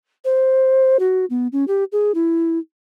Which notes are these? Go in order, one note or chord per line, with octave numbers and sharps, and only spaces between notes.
C5
F#4
B3
C#4
G4
G#4
E4